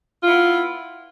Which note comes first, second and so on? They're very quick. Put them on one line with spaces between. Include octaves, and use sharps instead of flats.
F4 E4 B3